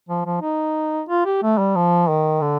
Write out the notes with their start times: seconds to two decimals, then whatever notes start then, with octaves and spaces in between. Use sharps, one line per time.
0.09 F3
0.25 F3
0.42 D#4
1.09 F4
1.25 G4
1.42 A3
1.58 G3
1.75 F3
2.09 D#3
2.41 D3